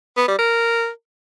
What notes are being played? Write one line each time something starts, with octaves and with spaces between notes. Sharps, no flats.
B3
G3
A#4